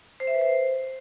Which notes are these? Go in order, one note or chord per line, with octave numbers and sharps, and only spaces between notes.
C5
E5
B4
C5